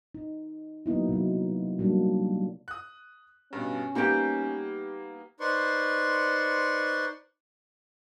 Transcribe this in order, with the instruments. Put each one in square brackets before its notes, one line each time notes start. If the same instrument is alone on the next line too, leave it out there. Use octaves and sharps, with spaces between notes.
[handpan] D#4
F#3 A#3 B3 D#4 E4
C3 F#3
F#3 G3 A#3 D4 D#4
[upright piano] D#6 F#6
[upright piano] G2 B2 [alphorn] C#4
[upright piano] G3 A#3 B3 [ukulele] D#4 G4
[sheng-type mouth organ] D#4 B4 C5 D5 C6 C#6